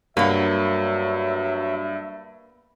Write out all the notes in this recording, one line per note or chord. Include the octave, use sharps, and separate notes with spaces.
G2 F#3 A#3 B3 E5